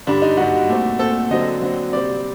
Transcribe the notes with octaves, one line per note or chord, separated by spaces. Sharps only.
G2 D3 G3 D4
D#4
G2 D3 G3 F#4
A#2 A3 C4
A#2 A3 C4 A4
D3 F#3 C4 D#5
D3 F#3 C4
C3 G3 C4 D5